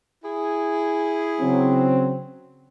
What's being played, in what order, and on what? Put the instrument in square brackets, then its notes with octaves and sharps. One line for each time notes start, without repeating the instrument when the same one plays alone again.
[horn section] E4 G#4
[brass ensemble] C#3 F#3 C4